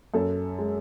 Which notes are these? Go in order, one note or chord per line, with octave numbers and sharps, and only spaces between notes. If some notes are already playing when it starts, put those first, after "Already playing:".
F#2 A4
G#3